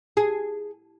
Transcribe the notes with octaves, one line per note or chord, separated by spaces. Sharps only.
G#4